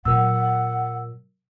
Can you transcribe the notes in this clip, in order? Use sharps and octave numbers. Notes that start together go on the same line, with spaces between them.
A#2 F#3 A#4 F#5 E6